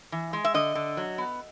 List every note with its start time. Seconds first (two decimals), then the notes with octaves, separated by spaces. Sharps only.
0.12 E3
0.33 G#3
0.45 E5
0.54 D3 D#5
0.75 D3
0.97 F#3
1.18 B3